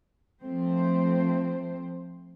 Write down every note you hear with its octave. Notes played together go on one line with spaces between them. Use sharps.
F3 A3 C4 C5